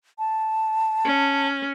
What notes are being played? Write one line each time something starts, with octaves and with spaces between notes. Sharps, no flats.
A5
C#4